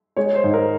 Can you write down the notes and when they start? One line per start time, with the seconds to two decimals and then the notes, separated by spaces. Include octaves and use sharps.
0.17 G#3 C#5
0.35 C5
0.44 G#2
0.54 A#4